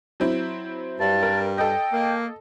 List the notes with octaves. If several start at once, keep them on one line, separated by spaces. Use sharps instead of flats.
F#3 C4 E4
G2 A5
A#4
A4 D#5 G5
A#3